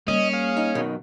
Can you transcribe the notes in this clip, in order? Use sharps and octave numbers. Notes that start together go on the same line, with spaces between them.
G3 A#3 C#4 D#5
G#4 F5
D#4
B1 B2 D#3